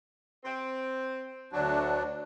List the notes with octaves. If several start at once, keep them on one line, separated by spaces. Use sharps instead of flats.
C4
D2 F#3 D4